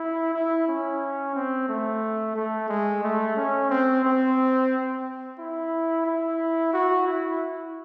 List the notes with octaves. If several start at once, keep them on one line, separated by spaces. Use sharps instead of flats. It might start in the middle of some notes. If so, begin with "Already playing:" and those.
Already playing: E4
E4
C#4
C4
A3
A3
G#3
A3
C#4
C4
C4
E4
E4
F#4
E4